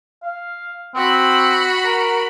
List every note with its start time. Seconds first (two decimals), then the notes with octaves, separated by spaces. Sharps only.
0.22 F5
0.95 C4 F#4 B5
1.86 A#4